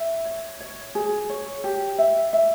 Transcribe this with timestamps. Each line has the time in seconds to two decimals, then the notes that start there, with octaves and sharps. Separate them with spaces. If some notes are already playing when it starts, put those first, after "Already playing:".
Already playing: E5
0.25 C#5
0.60 C#5
0.95 G#4
1.29 C#5
1.64 G4
1.98 E5
2.33 E5